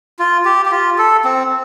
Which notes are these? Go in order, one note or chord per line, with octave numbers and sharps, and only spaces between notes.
F4
G4
G4
F4
A4
C4